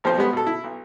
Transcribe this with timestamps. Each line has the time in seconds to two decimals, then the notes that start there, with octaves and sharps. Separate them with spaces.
0.04 B1 F3 C4 C5
0.18 G3 G#3 B3
0.33 B2 A4
0.47 E4
0.64 B1